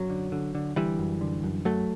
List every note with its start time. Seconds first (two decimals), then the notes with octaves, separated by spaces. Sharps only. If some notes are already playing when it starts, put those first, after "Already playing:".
Already playing: F#2 F#3
0.10 D3
0.32 D3
0.55 D3
0.76 D3 E3 G3
0.98 F#2
1.21 D3
1.44 F#2
1.65 F#2 F#3 A3